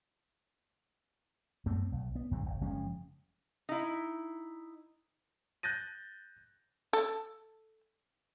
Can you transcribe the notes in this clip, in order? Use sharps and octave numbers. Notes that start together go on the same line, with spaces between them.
F#2 A3 B3 C4
B1
B3
F2 D3 G#3
G1
F#1 F3 G#3 C#4
D#4 E4
F#6 G6 A6 A#6 D#7
A4